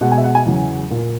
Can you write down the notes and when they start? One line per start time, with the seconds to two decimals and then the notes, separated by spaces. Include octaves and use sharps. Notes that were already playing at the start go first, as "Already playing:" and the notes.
0.01 B2 G#3 B3 F#5
0.12 G#5
0.18 E5
0.24 F#5
0.35 G#5
0.46 E2 C#3 F#3
0.91 A#2 A#3